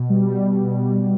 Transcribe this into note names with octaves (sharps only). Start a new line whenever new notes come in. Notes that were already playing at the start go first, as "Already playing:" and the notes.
Already playing: B2
G3
B2
G3